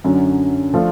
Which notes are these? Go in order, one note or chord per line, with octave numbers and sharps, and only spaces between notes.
F#2 D3 F#3 C#4
F3 A3 D4 F4